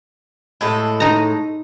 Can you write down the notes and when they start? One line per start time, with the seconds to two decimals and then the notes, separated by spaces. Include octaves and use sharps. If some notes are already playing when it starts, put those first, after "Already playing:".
0.61 A2 G#3 A4
1.00 D#4 A#5